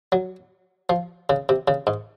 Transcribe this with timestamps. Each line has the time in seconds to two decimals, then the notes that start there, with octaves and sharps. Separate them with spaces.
0.12 F#3
0.89 F3
1.30 C#3
1.49 C3
1.68 C#3
1.87 G#2